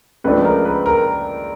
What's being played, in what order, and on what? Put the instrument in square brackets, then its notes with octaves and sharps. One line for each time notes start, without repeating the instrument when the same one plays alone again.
[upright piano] C#2 C#3 F3 A3 D4 [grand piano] B4
[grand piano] A#4
B4
A#4